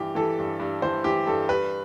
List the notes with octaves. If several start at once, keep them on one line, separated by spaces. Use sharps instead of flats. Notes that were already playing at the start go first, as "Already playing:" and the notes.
Already playing: G2 E3 G4
E3 A4
G2
G2
E3 C5
E3 G4
G2 A4
G2 B4